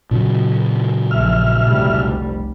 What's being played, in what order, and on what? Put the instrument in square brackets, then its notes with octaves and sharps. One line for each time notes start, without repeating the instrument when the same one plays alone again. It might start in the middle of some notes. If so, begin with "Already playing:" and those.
[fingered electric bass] A#2 C#3 F#3
[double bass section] A#1 [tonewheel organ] E5 F6
[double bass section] F1 C2 G3